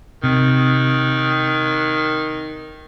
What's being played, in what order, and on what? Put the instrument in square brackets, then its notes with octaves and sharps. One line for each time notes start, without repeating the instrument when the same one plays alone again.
[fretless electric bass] C3 [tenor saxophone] D#3